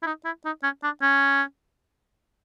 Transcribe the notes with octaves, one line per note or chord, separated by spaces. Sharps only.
E4
D#4
E4
D#4
C#4
D4
C#4